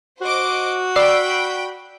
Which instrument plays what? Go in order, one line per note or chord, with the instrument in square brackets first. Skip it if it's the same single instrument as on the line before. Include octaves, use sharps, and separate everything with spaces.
[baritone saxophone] F#4 [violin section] C5 D#5 D6
[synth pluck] D5 E6 C7 [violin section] G5 B5